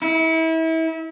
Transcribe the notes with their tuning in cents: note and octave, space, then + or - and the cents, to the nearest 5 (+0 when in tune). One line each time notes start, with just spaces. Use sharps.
E4 -30